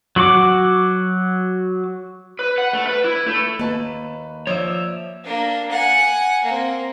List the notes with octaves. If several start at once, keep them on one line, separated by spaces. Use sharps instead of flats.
F#3 F#4 F#5 D6
B4
F#5
A3
B4
E4
A3
D#2 A#3 B4 A5
F3 C#5 D5 E5
A#3 D4
F#5 G#5
A#3 C4